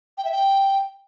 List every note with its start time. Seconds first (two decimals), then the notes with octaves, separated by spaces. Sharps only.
0.18 G5
0.25 E5
0.32 G5